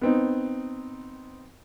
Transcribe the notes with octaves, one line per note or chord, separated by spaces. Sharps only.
B3 C4 D#4